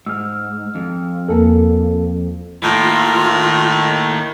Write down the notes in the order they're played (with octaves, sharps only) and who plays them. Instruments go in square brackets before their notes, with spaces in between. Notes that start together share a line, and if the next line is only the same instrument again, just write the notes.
[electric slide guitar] G#2 [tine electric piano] E6 F6
[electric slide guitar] F2
[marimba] E2 A#3 A#4 [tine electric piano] A4
[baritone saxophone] A2 [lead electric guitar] D#3 A#3 [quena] F4